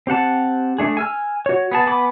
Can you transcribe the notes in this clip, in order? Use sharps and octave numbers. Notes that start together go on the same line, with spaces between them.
C4 G4 F#5 A5
A3 D4 G#4
G#5 E6 F6
F#4 C#5
B3 G#4 A5
B3 G#5 B5 D6